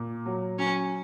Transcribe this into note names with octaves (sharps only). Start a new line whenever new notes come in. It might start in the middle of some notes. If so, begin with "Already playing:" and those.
Already playing: A#2
F#3
F#3 C#4